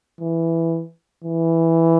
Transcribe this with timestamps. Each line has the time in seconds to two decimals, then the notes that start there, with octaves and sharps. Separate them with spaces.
0.21 E3
1.24 E3